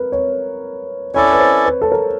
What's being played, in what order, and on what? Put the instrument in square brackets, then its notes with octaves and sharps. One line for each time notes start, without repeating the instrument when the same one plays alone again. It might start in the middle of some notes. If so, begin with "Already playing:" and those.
Already playing: [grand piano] A#4 B4
C#5
[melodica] C#4 E4 A4 D5 [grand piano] C#5
[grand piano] B4
C5
B4
A4
A#4